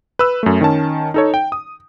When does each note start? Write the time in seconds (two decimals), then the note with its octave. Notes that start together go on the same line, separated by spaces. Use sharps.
0.19 B4 E6
0.43 F#2 A3
0.61 D#3 C#4 A5
1.14 D#4 A4 C#5
1.34 G5
1.52 D#6